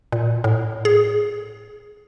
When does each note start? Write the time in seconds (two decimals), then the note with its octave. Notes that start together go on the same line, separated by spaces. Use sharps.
0.12 A#2
0.44 A2
0.85 G#4